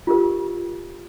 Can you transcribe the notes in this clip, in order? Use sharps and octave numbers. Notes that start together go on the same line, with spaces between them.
F4 G4 A#4